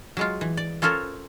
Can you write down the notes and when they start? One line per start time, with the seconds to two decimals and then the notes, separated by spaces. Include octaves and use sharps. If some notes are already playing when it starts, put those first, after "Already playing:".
0.17 F#3 G#3 F4
0.41 E3
0.57 D5
0.82 C#4 F4 A4 A#4 C5 C#5